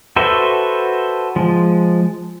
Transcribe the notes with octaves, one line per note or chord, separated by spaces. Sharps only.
F#4 A4 B4 C5 E5
F3 G#3